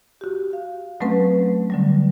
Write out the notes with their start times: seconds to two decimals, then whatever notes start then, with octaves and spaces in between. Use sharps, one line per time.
0.21 F#4 G4
0.53 F5
1.01 F#3 A3 C4 C#4 B4
1.70 D3 F#3 G3